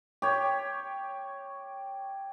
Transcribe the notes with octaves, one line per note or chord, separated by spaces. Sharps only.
G4 C#5